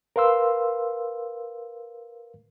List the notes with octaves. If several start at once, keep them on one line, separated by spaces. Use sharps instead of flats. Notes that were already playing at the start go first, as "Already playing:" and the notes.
A#4 B4 F5 C6 E6